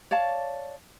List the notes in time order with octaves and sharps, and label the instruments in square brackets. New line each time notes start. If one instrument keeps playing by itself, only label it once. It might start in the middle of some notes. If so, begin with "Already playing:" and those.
[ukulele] C#5 D5 F5 A5